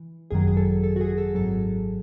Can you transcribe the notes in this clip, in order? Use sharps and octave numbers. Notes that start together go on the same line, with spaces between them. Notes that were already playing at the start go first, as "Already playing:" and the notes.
Already playing: E3
G#1 F#2 D#3 F#3 G#4
G#4
A4
A4
F#4
G#4
A4
G#1 G#2 F#3 A4